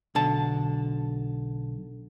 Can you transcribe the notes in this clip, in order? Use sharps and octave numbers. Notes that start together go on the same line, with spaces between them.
B1 D3 A5